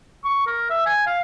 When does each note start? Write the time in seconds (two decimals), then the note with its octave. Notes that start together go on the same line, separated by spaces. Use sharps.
0.24 C#6
0.47 A#4
0.70 E5
0.86 G#5
1.06 F5